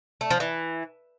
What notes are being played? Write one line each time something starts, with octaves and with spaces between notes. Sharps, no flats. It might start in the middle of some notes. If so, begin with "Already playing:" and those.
A3
F3
E3